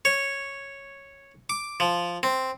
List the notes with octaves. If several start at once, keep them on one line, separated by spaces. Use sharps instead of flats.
C#5
D6
F3
C4